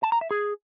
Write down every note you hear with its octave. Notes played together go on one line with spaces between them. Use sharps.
A5
A#5
E5
G#4